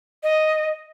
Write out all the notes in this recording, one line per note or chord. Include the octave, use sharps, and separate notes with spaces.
D#5